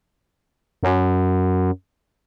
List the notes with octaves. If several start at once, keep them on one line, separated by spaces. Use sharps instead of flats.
F#2